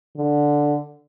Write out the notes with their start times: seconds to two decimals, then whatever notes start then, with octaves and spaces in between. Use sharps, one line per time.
0.16 D3